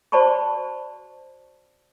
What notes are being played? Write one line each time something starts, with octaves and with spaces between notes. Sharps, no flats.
F#4 C5 D5 A5 B5 C#6